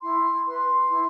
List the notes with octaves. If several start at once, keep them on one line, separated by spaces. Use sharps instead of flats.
E4 C6
B4 C6
E4